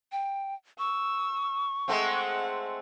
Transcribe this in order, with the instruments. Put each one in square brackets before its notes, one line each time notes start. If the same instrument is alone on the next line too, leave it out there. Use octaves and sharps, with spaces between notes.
[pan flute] G5
[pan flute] C#6 [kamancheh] E6
[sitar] G#3 A3 C4 [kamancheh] F#5